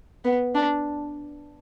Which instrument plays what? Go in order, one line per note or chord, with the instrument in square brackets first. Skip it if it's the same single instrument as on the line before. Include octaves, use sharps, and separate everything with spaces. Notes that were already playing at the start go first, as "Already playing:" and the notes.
[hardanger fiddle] B3
D4